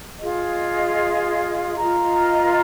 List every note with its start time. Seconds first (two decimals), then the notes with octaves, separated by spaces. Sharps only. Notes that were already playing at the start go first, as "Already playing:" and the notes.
0.20 F4 G#4 D#5
1.76 F4 A#4 D#5 A#5